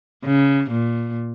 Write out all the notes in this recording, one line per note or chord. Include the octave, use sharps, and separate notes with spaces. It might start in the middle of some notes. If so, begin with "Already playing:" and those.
C#3
A#2